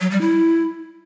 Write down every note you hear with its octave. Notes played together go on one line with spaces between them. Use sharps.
F#3
G3
E4